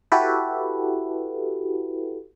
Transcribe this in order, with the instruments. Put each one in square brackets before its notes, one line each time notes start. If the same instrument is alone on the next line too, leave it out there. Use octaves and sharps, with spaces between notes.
[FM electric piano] E4 F#4 G4 A4 B4